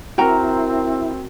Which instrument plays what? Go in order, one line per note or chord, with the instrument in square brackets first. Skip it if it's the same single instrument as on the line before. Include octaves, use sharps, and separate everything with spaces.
[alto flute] C4 [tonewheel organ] E4 [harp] F#4 A#4 [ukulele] G5 A#5